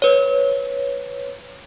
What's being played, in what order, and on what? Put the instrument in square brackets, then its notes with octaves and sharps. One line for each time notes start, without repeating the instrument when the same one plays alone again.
[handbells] B4 C#5